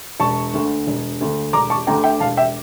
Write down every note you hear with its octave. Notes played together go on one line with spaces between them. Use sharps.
E1 A5 C#6
D2 D3
E1
D2 D3
E1 A#5 D6
A5 C#6
D2 D3 G5 A#5
E5 G5
E1 F5 A5
E5 G5